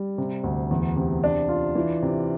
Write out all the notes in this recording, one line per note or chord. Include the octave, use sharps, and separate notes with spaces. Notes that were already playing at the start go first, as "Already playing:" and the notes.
Already playing: G3
C3
D2
E2
C3
D4
F4
E3
C3